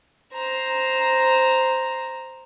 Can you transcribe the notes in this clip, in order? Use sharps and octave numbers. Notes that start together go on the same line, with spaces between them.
C5 A#5